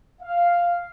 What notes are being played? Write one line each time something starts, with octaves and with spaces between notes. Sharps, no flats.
F5